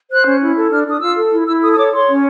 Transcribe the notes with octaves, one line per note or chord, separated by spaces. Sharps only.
C5 F#6
C#4
E4
A4
D4 F6
D4 D#6
F4 E6
A4
E4
E4 E6
A4 D#6
D#6
C#5 D6
C#5 C6
C#4